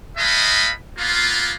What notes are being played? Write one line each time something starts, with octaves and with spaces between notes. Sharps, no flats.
G#3 A3 D#5 F5 B5
A#3 B3 F4